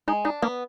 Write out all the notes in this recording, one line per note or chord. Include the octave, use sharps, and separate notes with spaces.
G#3 D#4
D4 D#4
A#3 B3